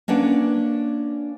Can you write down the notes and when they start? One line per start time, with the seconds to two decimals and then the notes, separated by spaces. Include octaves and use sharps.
0.08 A#3 C#4 D4 B4 C#5 F#5